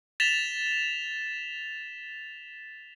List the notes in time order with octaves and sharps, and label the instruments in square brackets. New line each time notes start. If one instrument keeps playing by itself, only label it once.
[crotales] A6 B6 E7 F7 G7